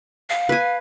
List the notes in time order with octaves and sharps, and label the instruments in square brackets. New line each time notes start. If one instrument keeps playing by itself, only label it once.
[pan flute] F5
[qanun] B4 G#5